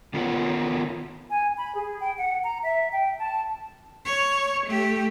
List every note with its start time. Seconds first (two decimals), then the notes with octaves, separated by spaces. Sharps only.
0.14 D#3 B3 C#4 F4 A#4 F#5
1.30 G#5
1.57 B5
1.74 G#4
2.00 G5
2.17 F#5
2.43 A#5
2.63 E5
2.92 G5
3.18 A5
4.05 C#5
4.66 A3 G4